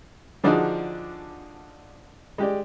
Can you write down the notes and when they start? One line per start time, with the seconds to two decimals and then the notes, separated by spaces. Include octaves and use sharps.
0.44 D3 F3 D4 D#4 F#4 G#4
2.38 G#3 G4 D5